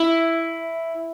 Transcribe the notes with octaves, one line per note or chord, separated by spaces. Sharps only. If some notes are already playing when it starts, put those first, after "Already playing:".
Already playing: E4